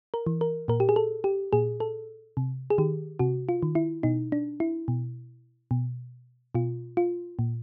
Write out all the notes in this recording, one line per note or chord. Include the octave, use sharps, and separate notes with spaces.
A#4
E3
A#4
A#2 A#4
G4
G#4
A4
G4
A#2 G#4
A4
C3
G#4
D#3 G4
C3 F#4
F4
D#3
E4
B2 D#4
D4
E4
B2
B2
B2 F4
F4
A#2